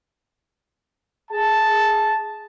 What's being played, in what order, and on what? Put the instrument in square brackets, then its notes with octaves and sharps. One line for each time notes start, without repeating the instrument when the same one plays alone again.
[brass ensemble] G#4 A5